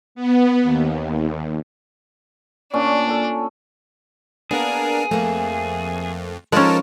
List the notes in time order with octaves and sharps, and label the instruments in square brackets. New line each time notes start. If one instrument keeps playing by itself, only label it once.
[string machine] B3
D#2
[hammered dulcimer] A#2 C#4 [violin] D4
[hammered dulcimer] A4 G#5
[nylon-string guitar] A#3 B3 [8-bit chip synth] D4 A#4 [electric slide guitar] G#4
[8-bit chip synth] F2 [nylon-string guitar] A3 A#3
[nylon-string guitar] F3 D#4 [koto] G#3 C#4 [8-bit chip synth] A4 A#4 A5